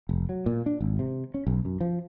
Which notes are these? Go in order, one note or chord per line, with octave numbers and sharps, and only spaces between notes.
F1
F#3
A#2
D4
G#1
C3
C#4
B1
F#2
F3